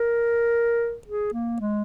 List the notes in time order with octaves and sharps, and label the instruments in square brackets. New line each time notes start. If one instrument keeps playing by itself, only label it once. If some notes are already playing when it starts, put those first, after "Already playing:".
Already playing: [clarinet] A#4
G#4
A#3
G#3